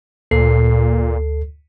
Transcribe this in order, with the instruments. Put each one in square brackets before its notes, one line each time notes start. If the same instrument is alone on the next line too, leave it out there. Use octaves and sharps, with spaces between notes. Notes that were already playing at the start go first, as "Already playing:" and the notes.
[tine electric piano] D2 A4 C7 [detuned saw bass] A#2